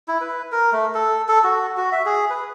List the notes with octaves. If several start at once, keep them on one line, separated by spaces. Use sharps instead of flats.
E4
B4
A#4
A3
A4
A4
F#4
F#4
E5
G#4
B4